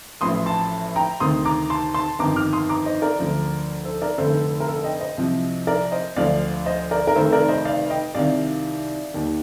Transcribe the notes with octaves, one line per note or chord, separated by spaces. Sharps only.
A1 A2 F3 C6 D#6
A5 C6
G5 A#5
D2 C3 D#3 C6 D#6
A#5 D6
A5 C6
A5 C6
G1 F2 D#3 A#5 D6
D6 F6
C6 D#6
A#5 D6
C5 D#5
A#4 D5
D2 D3 F3
A4 C5
A#4 D5
F1 F2 D3 A4 C5
A4
A#4
A4
D#5 G5
C5 D#5
C2 C3 F3
A#4 D5
C5 D#5
D2 D3 F3 D5 F5
C5 D#5
A#4 D5
A#4
F1 F2 C3 D#3 A4 C5
A#4 D5
C5 D#5
D5 F5
D#5 G5
C2 C3 D#3 D5 F5
D#2 D#3